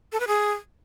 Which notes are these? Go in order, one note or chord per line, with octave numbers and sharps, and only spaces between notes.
A4
B4
G#4